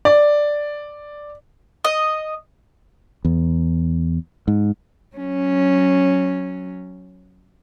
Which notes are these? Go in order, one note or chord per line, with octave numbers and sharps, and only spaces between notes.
D5
D#5
E2
G#2
F#3 C#4